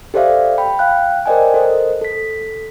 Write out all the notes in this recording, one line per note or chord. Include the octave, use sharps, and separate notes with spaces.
G4 A4 C5 D5 E5 F5
G5 B5
F5 G5 F#6
A#4 C5 D5 D#5 G5 G#5
A4 A#4 C5 D#5
A4 B6